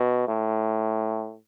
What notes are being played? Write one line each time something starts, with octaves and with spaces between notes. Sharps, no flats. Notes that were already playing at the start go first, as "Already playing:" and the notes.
Already playing: B2
A2